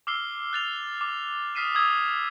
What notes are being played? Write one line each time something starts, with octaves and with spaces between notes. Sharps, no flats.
D6 E6 F6 C7 G7
F#6 A6 F7
D6
D#6 F6 B6 C7 D#7 E7
D#6 E6 G#6